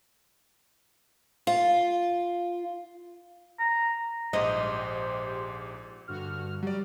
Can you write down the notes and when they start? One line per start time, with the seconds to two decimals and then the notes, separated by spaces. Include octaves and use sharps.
1.47 F4
3.59 A#5
4.33 A#1 G#2 G4 C5 D#5
6.08 G2 D3 F#4 F6
6.63 F#3 G3 D5